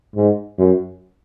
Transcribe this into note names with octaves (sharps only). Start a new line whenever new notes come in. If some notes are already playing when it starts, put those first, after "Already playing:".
G#2
F#2